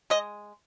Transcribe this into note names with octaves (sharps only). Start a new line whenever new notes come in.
G#3 D#5